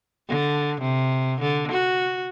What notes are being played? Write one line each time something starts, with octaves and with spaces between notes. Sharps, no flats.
D3
C3
D3
F#4